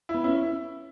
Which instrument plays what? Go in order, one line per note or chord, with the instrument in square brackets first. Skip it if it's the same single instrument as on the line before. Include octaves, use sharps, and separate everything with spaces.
[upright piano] E4
[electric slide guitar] B3
[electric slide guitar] C#4 [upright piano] E4